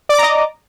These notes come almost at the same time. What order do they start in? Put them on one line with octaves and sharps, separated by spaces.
D5 D6 A#5 D#5